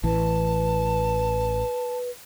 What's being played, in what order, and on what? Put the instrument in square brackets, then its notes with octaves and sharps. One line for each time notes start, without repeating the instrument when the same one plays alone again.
[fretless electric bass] A1 E3 [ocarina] B4 [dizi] A5